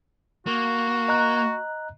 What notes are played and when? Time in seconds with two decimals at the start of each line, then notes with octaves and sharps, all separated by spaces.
0.47 A#3 F#4
1.08 D#5 A#5 F#6